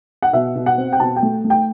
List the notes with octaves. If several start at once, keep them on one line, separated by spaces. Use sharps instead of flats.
F#5
B2 E5
B2
F#5
C4
G5
B2 A5
G5
A3
A3
G5